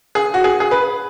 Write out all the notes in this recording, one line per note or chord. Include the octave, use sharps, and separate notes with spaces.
G#4
F#4
G#4
G#4
B4